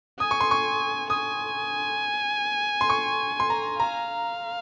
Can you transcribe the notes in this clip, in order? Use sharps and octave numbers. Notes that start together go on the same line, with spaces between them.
G#5 D#6
C#6
C6
C#6
G#5 D#6
C6
C#6
C6
A#5
F5 A#5